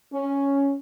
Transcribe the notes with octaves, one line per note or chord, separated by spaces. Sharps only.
C#4